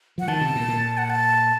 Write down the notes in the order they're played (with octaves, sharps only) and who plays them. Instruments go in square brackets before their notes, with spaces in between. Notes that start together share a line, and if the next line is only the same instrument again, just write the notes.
[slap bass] F3 [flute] F#5
[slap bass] D#3 [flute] A5
[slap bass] C3
A#2
A#2
[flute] F#5
A5